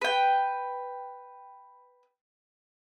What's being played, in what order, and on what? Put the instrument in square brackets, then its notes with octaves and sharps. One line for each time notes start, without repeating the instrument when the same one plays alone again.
[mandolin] B4 G5